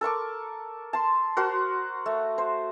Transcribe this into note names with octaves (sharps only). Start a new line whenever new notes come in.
A4 A#4 C#6 D6
A5 C6
F#4 A#4 C5 C6
A3
C5